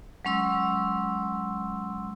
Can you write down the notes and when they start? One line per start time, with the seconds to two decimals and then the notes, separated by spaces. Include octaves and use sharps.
0.25 F#3 G#3 C#4 C6 E6